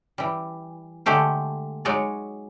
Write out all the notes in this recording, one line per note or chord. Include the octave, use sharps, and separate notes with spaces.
E3 G3
D3 G#3 A3 G4 C5
F#3 G#3 D#4 C#5 D5